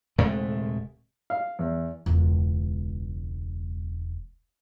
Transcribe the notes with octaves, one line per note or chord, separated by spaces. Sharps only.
D#1 C3 G#3 A3
F5
E2
E1 C#2